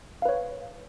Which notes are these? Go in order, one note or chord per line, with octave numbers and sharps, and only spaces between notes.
B4 C#5 F5